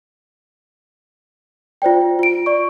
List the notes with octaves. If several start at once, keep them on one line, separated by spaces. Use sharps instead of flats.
F4 C5 D5 G5
F4 D7
D5 C#6